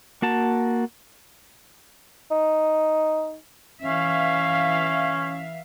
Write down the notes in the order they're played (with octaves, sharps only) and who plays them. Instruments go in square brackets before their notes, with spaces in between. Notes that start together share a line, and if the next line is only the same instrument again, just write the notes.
[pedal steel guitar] A#3 F#4 A5
[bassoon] D#4
[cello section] E3 E5 F5 [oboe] C#4